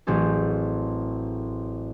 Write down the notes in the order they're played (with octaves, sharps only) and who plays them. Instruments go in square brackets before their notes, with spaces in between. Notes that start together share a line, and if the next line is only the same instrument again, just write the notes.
[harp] A1 F#3 C4 G#4 A4